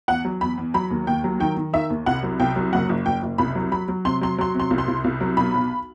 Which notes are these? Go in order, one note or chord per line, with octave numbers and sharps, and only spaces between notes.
E2 F#5
F#3
E2 B5
E2
F#3 B5
D#2
D#2 G5
F#3
D#3 G5
D#3
D#3 E5
D#2
C2 F#5
F#3
C2 G5
F#3
F#1 F#5
F#1
F#1 G5
F#1
C2 B5
F#3
F#3 B5
F#3
C3 C6
F#3 C6
F#3 C6
C3
C6
C2
C6
C2
C2
F#3
B1 B5
B1